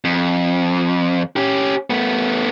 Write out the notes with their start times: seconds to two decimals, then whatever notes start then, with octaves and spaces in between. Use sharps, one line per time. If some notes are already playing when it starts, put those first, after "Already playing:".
0.05 F2
1.36 C#4 G4
1.90 A3 B3